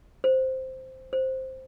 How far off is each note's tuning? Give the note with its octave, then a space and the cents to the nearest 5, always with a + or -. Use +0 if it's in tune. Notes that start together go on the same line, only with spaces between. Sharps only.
C5 +0
C5 +5